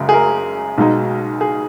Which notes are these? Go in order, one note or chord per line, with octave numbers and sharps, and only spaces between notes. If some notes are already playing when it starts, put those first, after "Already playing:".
Already playing: F#1 F#2 C#3 G#3
G#4
A#4
B1 B2 G#3 D#4
G#4